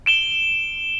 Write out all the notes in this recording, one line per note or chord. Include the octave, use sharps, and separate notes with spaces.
D7 E7 G7